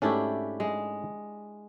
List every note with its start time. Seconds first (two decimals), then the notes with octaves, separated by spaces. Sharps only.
0.02 G#2 A3 C#4 D4 E4 G4
0.60 G#3